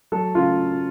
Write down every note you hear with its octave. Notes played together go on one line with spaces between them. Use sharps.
F#3 A4
C#3 F4